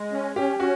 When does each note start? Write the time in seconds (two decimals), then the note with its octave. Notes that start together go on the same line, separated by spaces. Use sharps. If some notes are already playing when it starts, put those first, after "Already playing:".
Already playing: G#3
0.12 C#4
0.36 C#4 G4
0.60 C#4 F#4